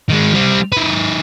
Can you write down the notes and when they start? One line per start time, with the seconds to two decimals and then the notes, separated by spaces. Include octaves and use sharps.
0.08 D#3 G#3
0.33 G3 C4
0.72 D#3 B4